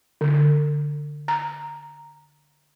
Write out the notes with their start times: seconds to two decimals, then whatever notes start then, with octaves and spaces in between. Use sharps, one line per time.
0.21 D3
1.28 A#5